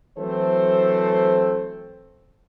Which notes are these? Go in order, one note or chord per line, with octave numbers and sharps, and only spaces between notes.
E3 F#3 A3 C4 A4 C5